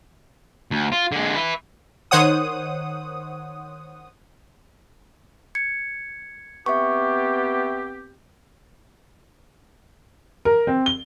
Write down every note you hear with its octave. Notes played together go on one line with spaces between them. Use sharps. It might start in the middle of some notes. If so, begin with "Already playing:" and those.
D2
F4
D3 G#3
B4 E5
D#3 C5 C#5 F#5 D#6
G#6 C#7
B3 C4 G4 E5 C#6
A#4
C4
G7